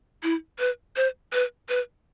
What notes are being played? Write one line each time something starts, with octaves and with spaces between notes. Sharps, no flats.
E4
B4
C5
B4
B4